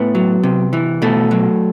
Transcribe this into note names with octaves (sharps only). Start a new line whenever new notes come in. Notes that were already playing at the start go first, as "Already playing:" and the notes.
Already playing: A2 B3
F#3
C3
E3
B2 A3
F#3